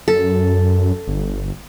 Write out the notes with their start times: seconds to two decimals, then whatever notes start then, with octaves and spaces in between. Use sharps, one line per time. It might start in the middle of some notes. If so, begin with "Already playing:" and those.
0.08 F#2 A4
1.07 G1